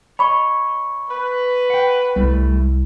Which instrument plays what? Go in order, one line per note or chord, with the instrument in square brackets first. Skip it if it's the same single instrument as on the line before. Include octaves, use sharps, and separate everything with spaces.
[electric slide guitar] C#5 D#5 [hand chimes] B5 C#6
[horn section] B4
[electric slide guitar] F#5 G5
[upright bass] C2 [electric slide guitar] G3 A3